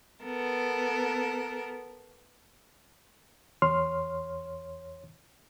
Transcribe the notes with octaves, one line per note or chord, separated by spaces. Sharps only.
B3 A4 A#4
E2 C#5 C6 F6